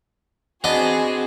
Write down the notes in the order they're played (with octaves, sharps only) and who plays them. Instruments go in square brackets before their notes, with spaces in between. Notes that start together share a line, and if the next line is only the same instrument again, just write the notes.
[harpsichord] B3 D4 D#5 [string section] C4 F#4 G#4